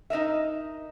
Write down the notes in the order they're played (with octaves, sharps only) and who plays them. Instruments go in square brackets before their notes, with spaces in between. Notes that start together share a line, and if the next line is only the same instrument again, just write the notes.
[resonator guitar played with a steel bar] D#4 A#4 D#5 E5